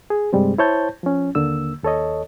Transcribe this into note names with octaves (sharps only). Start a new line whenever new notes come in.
G#4
G2 C3 G3 G#3 C4
E4 C5 C#5 A5 G6
F3 C#4
D#2 D3 A#3 E6
D#2 A4 C#5 D#5